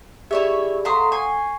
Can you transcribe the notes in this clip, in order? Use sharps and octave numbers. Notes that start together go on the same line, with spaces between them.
E4 G4 G#4 C#5 D5 E5
A3 F5 F#5 A#5 C6 D#6
G#5 C#6 C7